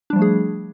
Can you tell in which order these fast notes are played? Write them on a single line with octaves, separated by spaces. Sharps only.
D4 G3 F3 A3 G#4